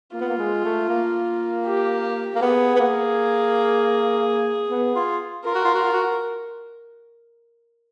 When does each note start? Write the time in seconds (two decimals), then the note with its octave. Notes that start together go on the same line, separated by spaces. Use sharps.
0.14 A#3 F4
0.21 B3
0.29 A#3
0.38 G#3
0.65 A3
0.89 A#3
1.65 G4
2.35 A#3
2.42 B3 G#4
2.75 B3
2.80 A#3
4.70 B3
4.95 F4
5.45 F4 A#4
5.55 F#4
5.65 F4
5.74 F#4
5.84 F4
5.93 F#4